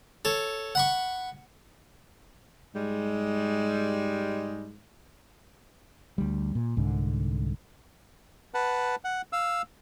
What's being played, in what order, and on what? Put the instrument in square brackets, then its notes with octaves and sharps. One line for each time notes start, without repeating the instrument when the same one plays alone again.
[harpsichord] A4 C#5
F#5 B5 C#6
[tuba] G#2 [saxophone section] G3 G#3
[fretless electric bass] D2 G3
A#2
C2 G#2 D3
[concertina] B4 F#5 A5
F#5
F5 E6